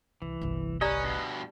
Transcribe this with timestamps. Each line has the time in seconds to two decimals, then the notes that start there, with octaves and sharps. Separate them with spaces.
0.22 C2 E3
0.41 G1 C2
0.81 C#4 G4 B4 D5 D#5 A#5
1.04 G2 B2